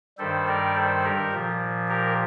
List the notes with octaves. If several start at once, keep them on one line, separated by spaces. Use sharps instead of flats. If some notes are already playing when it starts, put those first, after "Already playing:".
G2 D#3 G3 A4 C5
A#4 D5
A4 C5
G4 A#4
A#2 F3
G4 A#4